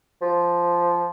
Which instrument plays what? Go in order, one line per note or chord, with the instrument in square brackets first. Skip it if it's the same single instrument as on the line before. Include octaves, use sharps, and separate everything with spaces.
[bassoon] F3